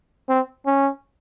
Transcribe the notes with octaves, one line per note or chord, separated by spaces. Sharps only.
C4
C#4